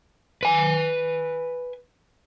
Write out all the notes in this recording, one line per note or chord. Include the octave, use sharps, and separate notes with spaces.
B4 G#5